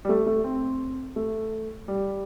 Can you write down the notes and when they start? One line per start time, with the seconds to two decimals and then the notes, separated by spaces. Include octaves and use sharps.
0.05 G3
0.09 A3
0.26 A3
0.44 C4
1.16 A3
1.88 G3